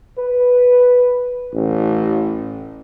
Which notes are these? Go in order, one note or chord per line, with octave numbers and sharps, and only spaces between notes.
B4
A1